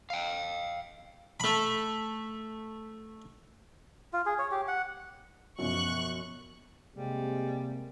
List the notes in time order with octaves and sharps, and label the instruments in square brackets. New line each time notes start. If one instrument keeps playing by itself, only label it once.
[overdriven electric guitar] F5 G5
[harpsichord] A3 B5
[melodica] F4
G#4
C#5
G4
F#5
[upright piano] F#2 B2 F3 [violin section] C#6 F#6
[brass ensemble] C3 A#3 [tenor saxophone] G3 [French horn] G#3